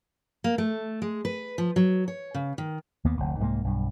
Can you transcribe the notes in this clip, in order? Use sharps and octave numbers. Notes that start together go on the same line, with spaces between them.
A#3
A3
G#3
B4
F3
F#3
C#5
C#3
D#3
D#2 A#3 B3
F1 D2
C2 G#2 G3 A#3
B1 G2